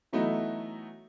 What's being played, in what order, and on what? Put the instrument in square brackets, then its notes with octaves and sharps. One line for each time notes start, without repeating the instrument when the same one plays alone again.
[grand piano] E3 F#3 A3 B3 D#4 E4